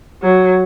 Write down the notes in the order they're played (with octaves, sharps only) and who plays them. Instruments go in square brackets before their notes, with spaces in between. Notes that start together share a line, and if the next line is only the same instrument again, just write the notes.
[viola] F#3